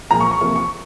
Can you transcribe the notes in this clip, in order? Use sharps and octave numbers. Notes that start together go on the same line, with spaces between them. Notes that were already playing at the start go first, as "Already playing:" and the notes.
A#2 F3 G#3 A#5
C#6
C#6
C3 F3 A#3 C#6
C#6